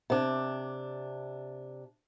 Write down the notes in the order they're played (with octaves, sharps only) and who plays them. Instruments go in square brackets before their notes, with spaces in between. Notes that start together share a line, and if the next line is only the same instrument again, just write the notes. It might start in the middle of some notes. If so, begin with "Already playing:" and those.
[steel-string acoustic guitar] C3 D4